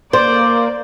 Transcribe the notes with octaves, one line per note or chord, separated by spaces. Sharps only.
A#3 C5 D5